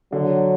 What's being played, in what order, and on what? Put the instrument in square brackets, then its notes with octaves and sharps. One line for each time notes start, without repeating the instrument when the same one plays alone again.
[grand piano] D3 [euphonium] F#3